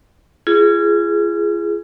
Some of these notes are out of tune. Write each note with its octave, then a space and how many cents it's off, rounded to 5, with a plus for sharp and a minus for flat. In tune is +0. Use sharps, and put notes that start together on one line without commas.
F4 -35 G#4 +0